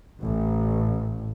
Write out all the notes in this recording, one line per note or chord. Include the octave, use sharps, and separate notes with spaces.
A1